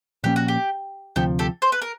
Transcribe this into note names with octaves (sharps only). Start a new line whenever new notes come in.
A#2 F3 A#3 C#4 G4
F#4
G4
D2 C3 F3 G4 A4
G4 A4
C5
B4
A#4